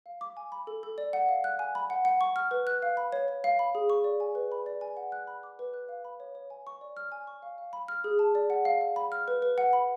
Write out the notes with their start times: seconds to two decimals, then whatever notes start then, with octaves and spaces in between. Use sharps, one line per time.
0.06 F5
0.21 D6
0.37 G#5
0.52 B5
0.67 A4
0.83 A4
0.98 D5
1.13 F#5
1.29 F5
1.44 F#6
1.59 G#5
1.75 B5
1.90 F#5
2.05 F#5
2.21 C#6
2.36 F6
2.51 B4
2.67 F#6
2.82 F5
2.97 B5
3.12 C#5
3.28 C#5
3.44 F5
3.59 B5
3.75 G#4
3.90 C#6
4.04 D5
4.20 G#5
4.35 B4
4.52 B5
4.66 D5
4.81 G#5
4.97 F#5
5.12 F#6
5.27 B5
5.43 D6
5.59 B4
5.74 F#6
5.89 F5
6.05 B5
6.20 C#5
6.35 C#5
6.50 G#5
6.67 C#6
6.81 D5
6.97 F6
7.12 G#5
7.27 C#6
7.42 F5
7.58 F5
7.73 B5
7.88 F6
8.04 G#4
8.19 A5
8.35 D5
8.50 F#5
8.65 F5
8.81 F5
8.96 B5
9.12 F6
9.28 B4
9.42 B4
9.58 F#5
9.73 B5